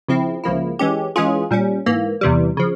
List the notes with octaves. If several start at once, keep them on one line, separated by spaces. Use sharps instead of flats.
C#3 F3 C4 E4
C#2 C#3 F3 A#3 E4
E3 G#3 C#4 G4
E3 G#3 C#4 F4 G#4
A#2 G3 C#4
G#2 E3 A#3
E2 C3 E3 G3
C#3 F3